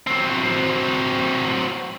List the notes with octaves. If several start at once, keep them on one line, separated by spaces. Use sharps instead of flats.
F#3 C4